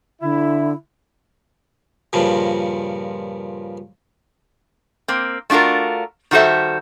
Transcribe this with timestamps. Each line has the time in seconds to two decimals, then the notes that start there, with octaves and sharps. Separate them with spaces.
0.22 D3 E4
2.13 G2 A#2 C#3 F3
5.08 A#3 C4
5.50 A3 D4 F4 F#4 A#4
6.31 D#3 G3 F#4 A4 C5 E5